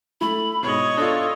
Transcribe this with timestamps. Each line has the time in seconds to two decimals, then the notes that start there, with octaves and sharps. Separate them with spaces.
0.21 A3 E4 B5
0.63 G#2 B2 C#5 D#5
0.98 D4 F4 A4